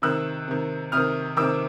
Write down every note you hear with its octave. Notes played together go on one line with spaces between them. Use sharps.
C3 D#3 E6 F#6
C3 D#3
C3 D#3 D#6 F6
C3 D#3 D6 E6